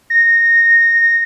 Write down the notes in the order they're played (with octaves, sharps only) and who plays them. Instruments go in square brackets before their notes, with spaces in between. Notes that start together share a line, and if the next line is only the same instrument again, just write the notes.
[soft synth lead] A#6